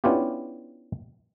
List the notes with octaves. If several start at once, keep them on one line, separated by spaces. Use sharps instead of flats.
B3 C#4 D4 E4 F4 G4